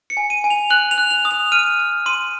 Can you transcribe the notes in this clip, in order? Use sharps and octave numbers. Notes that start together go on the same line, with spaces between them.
C#7
G#5
D#7
G#5
F7
F#6 F#7
F7
F#6
F7
D#6
F7
F6 D#7
F6
C6 D#7